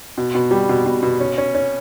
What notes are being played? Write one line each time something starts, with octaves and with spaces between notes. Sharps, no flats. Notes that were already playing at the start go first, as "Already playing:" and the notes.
B2
B2
G3
B2
B2
B2
C#4
C#4
C#4